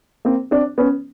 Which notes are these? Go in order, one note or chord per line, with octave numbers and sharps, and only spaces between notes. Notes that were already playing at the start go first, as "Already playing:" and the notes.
A#3 C4
C4 D4
B3 C#4